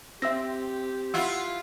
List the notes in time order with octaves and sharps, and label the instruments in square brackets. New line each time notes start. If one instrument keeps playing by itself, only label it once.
[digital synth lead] C4 [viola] G4 [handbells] E5 E6 A#6
[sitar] E4 F4 [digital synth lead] F#5 [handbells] E6